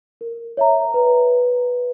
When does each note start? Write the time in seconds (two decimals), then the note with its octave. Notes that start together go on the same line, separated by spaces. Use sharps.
0.21 A#4
0.57 C#5 E5 A#5
0.94 B4